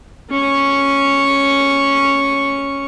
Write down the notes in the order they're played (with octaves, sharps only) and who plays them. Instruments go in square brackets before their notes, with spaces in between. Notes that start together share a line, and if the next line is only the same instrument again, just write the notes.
[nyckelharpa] C#4 C#6